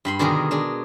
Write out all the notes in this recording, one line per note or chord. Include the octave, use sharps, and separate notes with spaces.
G2 B5 C6
B2 D3 D#3 G#4 A#4
G#3 D4 G#4